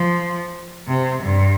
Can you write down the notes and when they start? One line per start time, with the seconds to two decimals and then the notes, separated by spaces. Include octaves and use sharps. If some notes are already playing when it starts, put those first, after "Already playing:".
Already playing: F3
0.88 C3
1.22 G2